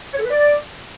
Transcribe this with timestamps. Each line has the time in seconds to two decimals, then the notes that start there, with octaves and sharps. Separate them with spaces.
0.14 C#5
0.19 A4
0.25 B4
0.31 D5